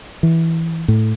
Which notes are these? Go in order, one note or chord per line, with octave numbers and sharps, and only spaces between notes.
E3
A2